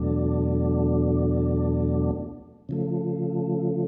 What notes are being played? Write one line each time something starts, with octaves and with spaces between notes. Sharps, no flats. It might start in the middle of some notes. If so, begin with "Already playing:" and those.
Already playing: E2 B2 F#3 A3 D4
C#3 F3 A3